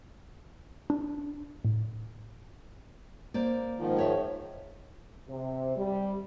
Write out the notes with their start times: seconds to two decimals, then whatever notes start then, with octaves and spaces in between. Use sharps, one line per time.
0.90 D4
1.65 A2
3.34 A#3 C5 D5
3.77 G#2 D#3 F3
3.96 G#4 C#5 E5
5.28 C3
5.76 G3